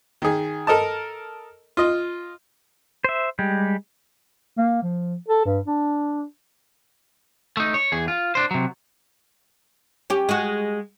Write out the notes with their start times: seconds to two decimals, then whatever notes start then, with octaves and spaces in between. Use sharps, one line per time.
0.22 D#3 G#4
0.67 A4 A#4 D#5 A5
1.77 F4 D#5
3.04 C5 E5
3.39 G3 G#3 G4
4.58 A#3
4.82 F3
5.29 A4
5.46 G2
5.67 D4
7.57 A3 D#4
7.74 C#5
7.92 E2 G#4
8.08 F4
8.35 D4 C5
8.51 C3 F#3
10.10 C#4 G4
10.29 G#3 F#4